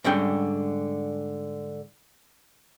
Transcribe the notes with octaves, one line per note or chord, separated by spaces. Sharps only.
G#2 D3 G3 C#4 G5